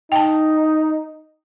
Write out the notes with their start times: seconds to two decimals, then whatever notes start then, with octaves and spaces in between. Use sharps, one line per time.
0.12 D#4 G5 A5